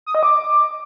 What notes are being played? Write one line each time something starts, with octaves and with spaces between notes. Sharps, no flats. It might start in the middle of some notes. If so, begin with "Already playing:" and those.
D#6
D#5
D6